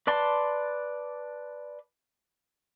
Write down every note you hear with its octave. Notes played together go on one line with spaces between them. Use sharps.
B4 D5 A5 C6